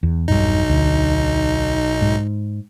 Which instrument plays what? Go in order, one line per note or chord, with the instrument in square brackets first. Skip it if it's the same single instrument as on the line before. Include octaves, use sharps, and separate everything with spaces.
[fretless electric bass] E2
[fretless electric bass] E1 G2 [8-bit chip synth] B1 D#4
[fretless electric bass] D2
G#2